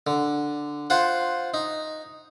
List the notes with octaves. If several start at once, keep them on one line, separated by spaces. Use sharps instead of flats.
D3
F4 C5 F#5
D#4